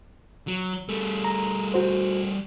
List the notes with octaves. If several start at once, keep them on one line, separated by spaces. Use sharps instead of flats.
F#3
G3 A3
A#5
F#4 C5